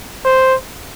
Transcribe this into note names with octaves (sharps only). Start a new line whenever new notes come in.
C5